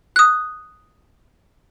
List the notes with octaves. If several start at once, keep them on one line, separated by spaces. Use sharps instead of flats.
D#6 F#6